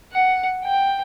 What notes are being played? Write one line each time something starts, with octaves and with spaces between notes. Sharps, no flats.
F#5
G5